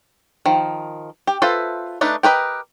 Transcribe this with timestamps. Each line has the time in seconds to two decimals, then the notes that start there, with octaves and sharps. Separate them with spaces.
0.46 D#3 F3
1.27 G4
1.42 F4 A4 B4 C5 E5
2.01 A3 D4 D#4 B4
2.23 G4 A#4 B4 D#5